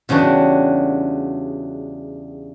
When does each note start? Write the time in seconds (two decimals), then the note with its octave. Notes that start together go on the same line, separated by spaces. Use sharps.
0.09 E2 C#3 G3 D4 F#4